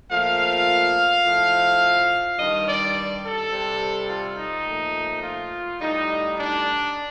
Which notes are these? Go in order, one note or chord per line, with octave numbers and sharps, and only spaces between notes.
A#2 F3 A3 F5
A2 F3 A3
G2 D#3 G3 D#5
D5
A4
C3 G3
F4
D#4
A#2 F3 A3
F4
A2 G3 D#4
D4